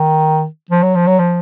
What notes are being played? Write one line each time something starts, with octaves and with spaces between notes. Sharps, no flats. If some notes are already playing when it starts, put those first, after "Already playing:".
Already playing: D#3
F3
F#3
F3
F#3
F3